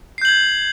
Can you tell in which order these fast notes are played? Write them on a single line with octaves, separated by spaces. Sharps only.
C7 G6 F#7 G#6